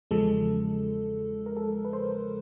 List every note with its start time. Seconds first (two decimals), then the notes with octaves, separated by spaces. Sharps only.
0.11 E2 C#3 F3 G#3 A4
1.46 A#4
1.57 A4
1.85 B4
1.93 C5